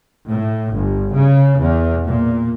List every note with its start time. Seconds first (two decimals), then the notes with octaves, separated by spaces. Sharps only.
0.29 A2
0.75 G1
1.16 C#3
1.59 E2
2.06 A#2